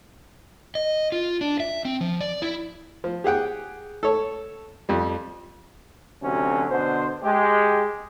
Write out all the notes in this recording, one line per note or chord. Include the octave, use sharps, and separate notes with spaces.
D#5
F4
D4
E5
C4
F3
D5
E4
F3
G4 G#4 F#5 G5
A4 C#5
F2 G3
D2 C3 F#3 C#4
B2 D3 C5
G#3 G4